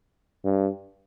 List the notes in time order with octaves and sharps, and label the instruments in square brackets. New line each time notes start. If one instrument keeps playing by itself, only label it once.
[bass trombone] G2